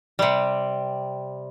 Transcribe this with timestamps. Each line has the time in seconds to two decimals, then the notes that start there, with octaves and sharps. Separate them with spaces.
0.19 C3 G3